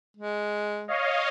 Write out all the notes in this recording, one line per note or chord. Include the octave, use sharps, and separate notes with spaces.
G#3
C#5 D#5 F5